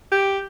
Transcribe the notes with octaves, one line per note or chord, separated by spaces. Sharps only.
G4